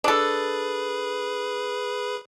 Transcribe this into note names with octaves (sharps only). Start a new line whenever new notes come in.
D4 G#4 A4 B4 B5